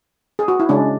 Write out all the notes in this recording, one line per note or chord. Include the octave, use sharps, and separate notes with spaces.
G#4
F#4
E4
C#3 G#3 C#4 D4